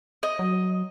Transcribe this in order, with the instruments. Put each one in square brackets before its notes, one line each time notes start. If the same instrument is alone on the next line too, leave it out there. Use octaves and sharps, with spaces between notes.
[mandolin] D#5
[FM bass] F#3